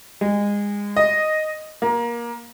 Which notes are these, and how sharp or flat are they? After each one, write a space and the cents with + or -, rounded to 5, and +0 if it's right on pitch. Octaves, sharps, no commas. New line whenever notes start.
G#3 -25
D#5 -5
A#3 +20